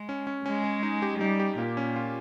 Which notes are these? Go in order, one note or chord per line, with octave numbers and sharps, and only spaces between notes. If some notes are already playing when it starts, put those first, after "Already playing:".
Already playing: G#3
C#4
C#4
G#3 C#4
C#4
D#4
G4
G3 D#4
G4
A#2 A#3
C#4
F4